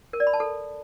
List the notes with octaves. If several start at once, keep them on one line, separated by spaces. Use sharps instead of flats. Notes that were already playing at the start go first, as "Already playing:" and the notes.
A#4
D5
B5
A5
A4